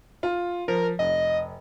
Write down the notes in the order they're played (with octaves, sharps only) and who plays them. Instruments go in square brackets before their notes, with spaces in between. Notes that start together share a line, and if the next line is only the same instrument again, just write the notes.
[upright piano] F4
[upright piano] F3 [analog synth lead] A#4
[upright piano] F1 [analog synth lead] D#5